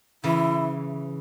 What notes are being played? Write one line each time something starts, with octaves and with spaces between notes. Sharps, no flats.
C#3 E3 E4